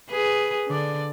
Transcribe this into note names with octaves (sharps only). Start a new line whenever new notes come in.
G#4 B4
D3 D5